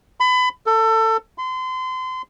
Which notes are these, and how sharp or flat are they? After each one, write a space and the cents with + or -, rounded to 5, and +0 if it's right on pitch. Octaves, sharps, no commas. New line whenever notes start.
B5 +30
A4 +25
C6 -30